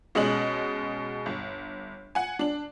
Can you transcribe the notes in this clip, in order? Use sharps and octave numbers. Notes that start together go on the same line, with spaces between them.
B2 G#3 C#4 D#5 F#7
G1
F#5 G#5
D4 F#7